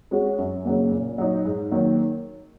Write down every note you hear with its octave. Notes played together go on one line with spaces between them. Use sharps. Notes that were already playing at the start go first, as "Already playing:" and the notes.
G#3 C#4 F#4
F#2
C#3 F#3 A#3
A#2
F#3 D#4
G#2
D#3 F#3 A#3